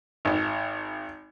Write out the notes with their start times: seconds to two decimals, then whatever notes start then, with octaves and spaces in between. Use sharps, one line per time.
0.25 G#1